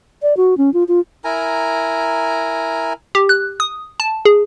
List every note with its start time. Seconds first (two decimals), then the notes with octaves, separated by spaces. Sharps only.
0.22 D5
0.37 F#4
0.57 C#4
0.74 F4
0.88 F4
1.24 E4 A#4 G#5 A#5
3.15 G4
3.29 F#6
3.60 D#6
4.00 A5
4.25 G#4